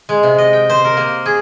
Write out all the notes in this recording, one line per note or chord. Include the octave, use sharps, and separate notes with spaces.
G#3
C3
D#5
G5
C5
A#4
A#3
G#4